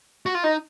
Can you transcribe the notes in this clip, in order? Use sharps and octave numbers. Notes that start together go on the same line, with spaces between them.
F#4
F4
D#4 D#5